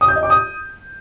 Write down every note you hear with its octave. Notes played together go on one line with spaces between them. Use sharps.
D#6
G6
D#5
D6
D#6